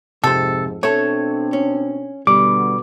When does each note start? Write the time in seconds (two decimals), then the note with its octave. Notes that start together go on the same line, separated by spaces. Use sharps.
0.24 F2 G#2 C3 A4 C5
0.83 B2 A3 C4 D4 A4 C#5
1.53 C#4
2.27 B2 D3 G3 D6